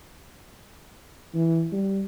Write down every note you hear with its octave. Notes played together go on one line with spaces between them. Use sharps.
E3
G3